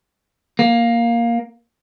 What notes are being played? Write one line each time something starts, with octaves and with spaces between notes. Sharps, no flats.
A#3